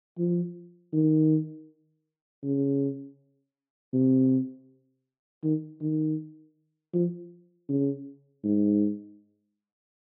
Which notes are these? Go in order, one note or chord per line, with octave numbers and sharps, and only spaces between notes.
F3
D#3
C#3
C3
D#3
D#3
F3
C#3
G#2